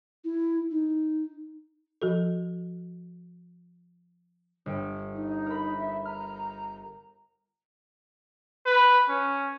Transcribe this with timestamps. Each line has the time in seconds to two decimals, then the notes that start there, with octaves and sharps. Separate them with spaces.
0.24 E4
0.71 D#4
2.02 F3 F#4 A4
4.66 G1 G5
5.14 D#4
5.46 A#4 B5
5.77 E5
6.05 A#5 F6
8.66 B4
9.09 C#4